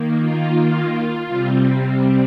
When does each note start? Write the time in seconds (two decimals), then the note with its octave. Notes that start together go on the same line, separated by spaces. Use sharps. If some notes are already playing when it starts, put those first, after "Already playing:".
Already playing: D#3 A#3
0.19 F4
1.27 C3 G3 C4